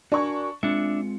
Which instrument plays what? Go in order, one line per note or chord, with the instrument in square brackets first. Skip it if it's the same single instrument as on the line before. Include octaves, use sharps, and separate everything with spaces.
[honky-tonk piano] D4 C#6 [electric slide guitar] F#4 A#4 G#5
[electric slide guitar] G#3 C4 F4 [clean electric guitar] D4 E5 [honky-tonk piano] C#7